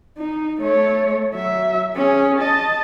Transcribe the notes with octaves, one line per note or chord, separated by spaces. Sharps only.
D#4
A3 C#5
F#3 E5
C#4 G#4
D#5 A5